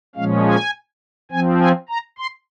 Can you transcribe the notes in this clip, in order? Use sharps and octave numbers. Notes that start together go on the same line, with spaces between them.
A#2 F3 G#3 C#4 F5
G#5
F3 C4 G#5
G#5
A#5
C6